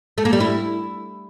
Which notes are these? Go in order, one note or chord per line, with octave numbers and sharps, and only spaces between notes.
A3
A#3
G3
E4